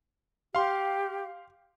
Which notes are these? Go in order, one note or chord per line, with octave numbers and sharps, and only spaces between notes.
G4 F5 C6